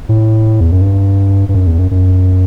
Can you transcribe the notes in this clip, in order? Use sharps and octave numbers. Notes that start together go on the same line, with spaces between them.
A2
E2
F#2
G2
G2
F#2
E2
F#2
F#2